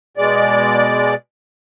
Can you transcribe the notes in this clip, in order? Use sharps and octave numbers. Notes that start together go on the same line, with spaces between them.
B2 G#3 D5